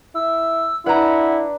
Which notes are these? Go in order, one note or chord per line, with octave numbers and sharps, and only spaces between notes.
E4 E6
D4 E4 B4 F#5 A#5